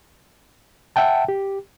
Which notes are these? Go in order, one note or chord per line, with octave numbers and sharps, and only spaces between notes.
E5 F#5 G5 A5
G4